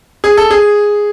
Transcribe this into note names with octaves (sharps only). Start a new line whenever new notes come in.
G#4
A4
G#4